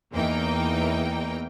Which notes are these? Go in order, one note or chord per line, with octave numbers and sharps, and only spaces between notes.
E2 E3 A#3 D#4 G5